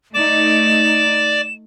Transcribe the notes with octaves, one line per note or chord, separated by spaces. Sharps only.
A3 D#4 D5 D6 E7